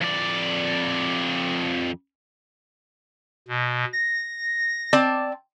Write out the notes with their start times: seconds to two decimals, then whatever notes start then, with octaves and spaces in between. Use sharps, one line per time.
0.02 F2 D5
3.48 B2
3.93 A#6
4.93 C4 D5 A5